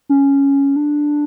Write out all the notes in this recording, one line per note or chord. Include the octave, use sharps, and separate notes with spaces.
C#4
D4